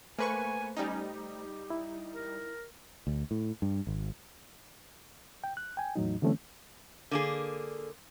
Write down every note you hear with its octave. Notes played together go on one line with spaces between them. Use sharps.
A3 A#3 B4 C5 G#5 C#6
G3 C#4 D#4
G4
E4
A#4
D2
A2
G2
G#1
G5
F#6
G5 G#5
E2 A2 F#3 D#4
D3 E3 G3 A3 C4 C#4
D3 A#3 G#4